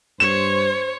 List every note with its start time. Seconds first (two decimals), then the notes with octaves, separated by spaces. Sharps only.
0.20 G2 C5 C#5 E7